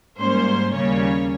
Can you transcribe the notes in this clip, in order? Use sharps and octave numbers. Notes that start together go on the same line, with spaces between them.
G#2 G3 A#3 C#4 C5
D#2 C#3 G3 A#3 C#4 C#5